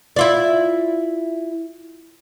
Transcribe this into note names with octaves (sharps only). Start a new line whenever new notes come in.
E4 F4 D5